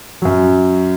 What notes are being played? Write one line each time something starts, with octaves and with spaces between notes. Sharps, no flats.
F#2 F#3